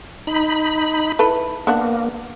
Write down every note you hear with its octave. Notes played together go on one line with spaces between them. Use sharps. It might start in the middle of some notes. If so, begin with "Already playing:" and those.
D#4 B5
E4 A4 B4
A#3 B3 D4 F#5